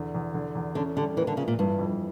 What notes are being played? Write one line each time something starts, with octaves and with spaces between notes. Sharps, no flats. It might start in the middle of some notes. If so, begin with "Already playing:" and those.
Already playing: E2 D3
E2
D3
E2
D3 C#4
D3 G3
E3 A#3
D3
C#3 F3
A#2
G2 E3
F2